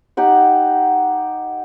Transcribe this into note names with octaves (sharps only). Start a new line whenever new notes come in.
D#4 G4 F#5